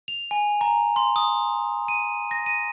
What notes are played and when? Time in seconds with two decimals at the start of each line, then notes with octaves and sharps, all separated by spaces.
0.08 F7
0.31 G#5
0.61 A#5
0.96 C6
1.16 D#6
1.88 D#7
2.31 A#6
2.46 D#7